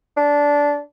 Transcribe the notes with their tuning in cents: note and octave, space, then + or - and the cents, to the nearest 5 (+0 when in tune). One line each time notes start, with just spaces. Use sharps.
D4 -15